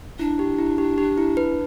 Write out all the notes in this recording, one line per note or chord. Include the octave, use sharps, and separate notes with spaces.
D4 E4
G4
E4
G4
G4
E4
B4